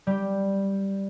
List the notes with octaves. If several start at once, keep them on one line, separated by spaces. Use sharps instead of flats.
G3 G4